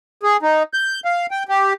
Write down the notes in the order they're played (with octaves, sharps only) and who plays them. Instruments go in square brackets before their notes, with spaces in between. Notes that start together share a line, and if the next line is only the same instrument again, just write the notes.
[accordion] G#4
D#4
G6
F5
G5
G4